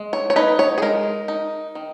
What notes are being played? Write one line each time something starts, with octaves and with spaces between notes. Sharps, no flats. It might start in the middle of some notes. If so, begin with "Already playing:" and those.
Already playing: G#3
C#5
C#5
D#4 B4
C#5
G#4
G#3 A#4
D#4
D#3